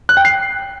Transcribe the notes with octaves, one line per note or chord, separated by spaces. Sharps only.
F#6
G5
C7